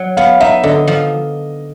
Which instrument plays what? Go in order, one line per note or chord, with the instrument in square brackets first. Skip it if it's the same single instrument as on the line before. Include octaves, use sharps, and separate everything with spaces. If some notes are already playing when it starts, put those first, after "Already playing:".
Already playing: [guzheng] F#3
[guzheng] B3 [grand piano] F5
[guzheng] D#4 [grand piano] E5
[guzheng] D3 [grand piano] D#5
[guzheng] F3